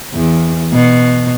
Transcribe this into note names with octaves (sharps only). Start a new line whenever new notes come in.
E2
B2